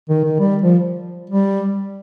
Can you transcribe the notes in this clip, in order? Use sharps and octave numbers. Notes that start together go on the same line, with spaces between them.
D#3
D#3
G3
F3
G3